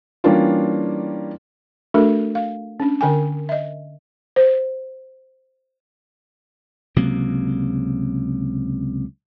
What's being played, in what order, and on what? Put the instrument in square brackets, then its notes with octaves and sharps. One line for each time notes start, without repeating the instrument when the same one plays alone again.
[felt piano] E3 G3 A#3 C#4 D4 F4
[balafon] A3 D4 F#4 A4 A#4
F5
C#4 D4
D3 A#4 G5 G#5
D#5 E5
C5
[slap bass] C#2 C3 F#3 A#3